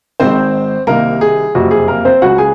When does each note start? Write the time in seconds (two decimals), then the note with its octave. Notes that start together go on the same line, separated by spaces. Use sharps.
0.20 G#1 G#2 D#3 C4 C5
0.87 C2 C3 D#3 A#3 A#4
1.21 G#4
1.55 F#1 F2 C3 F#4
1.71 G#4
1.88 A#3 A#4
2.05 C4 C5
2.21 C#2 C#3 F#4 F#5
2.38 G#4 G#5